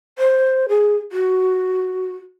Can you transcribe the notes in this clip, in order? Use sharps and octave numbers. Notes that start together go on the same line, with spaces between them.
C5
G#4
F#4